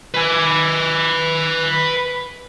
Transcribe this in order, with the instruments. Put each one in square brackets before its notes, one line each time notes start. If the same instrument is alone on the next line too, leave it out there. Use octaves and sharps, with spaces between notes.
[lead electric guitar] B4 G#5